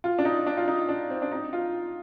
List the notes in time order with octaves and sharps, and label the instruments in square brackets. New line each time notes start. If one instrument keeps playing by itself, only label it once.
[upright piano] F4
D4
D#4
D4
F4
D#4
D4
C4
D4
D#4
F4